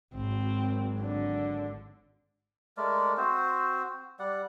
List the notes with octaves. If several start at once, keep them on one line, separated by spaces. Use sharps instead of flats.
G#1 F#3 C4
D3
G#3 A3 A#4 D5
C4 F#4 C5
G3 D5 F#5